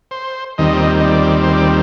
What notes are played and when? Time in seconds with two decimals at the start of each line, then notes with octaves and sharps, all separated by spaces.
0.11 C5
0.58 D#2 D#3 G3 C4 D#5
1.00 D#5
1.06 D5
1.43 C5
1.53 D5